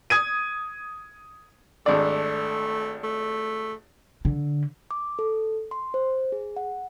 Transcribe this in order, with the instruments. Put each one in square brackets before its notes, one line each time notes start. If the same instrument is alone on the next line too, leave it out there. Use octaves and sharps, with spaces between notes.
[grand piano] D#6 G#6 D#7
[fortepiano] G#1 D4 D5 [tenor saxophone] A3
[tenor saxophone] A3
[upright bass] D3
[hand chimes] D6
A4
C6
C5
G#4
F#5